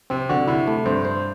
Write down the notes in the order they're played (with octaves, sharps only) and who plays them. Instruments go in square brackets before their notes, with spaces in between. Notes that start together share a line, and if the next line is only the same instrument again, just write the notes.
[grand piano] C3 [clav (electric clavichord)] C4
[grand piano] D3 [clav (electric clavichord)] F#4
[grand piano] C3 [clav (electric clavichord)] E4
[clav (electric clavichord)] A3
[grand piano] G2 [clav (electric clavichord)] C5
[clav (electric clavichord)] C5